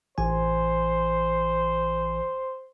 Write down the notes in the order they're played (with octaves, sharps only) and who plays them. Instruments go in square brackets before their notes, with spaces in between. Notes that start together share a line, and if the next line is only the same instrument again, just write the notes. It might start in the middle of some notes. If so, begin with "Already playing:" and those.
[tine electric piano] A1 E3 G#5 [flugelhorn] C5